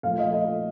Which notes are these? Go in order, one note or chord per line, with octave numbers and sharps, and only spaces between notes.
A#2 F3 A3 F5
D#5
D#5